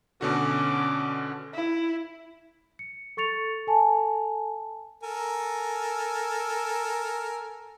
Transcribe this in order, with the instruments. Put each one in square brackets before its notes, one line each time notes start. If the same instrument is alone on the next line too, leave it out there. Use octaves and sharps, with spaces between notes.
[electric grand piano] B2 D3 F#4 [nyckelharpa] C#4 D6
[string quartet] E4
[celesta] C#7
A4 C#6 A6 C#7 F7
A4 G#5 A5
[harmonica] A4 A#4 G#5